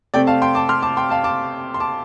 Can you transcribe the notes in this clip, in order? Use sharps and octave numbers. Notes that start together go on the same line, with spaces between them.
C3 A3 C4 D5 G5
F5 A5
G5 C6
A5 D6
C6 F6
A5 D6
G5 C6
F5 A5
A5 D6
C6
A5 D6